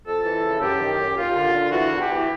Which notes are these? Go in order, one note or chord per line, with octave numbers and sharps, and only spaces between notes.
F2 A4
E3
C#3
F#2 G4
D#3
F#2
D#2 F4
D3
D3
E3 F#4
E2
G4
E3